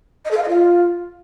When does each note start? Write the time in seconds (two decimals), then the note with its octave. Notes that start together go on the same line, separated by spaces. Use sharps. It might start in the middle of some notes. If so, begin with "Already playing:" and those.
0.25 D#5
0.31 A4
0.37 F5
0.42 D#5
0.48 F4